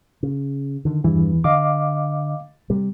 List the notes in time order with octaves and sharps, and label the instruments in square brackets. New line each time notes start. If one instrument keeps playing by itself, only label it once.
[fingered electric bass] C#3
D3 D#3
[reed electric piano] E2 E3 [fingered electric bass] G2
[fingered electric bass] D3 [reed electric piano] D#5 F5 D6
[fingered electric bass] C3 G3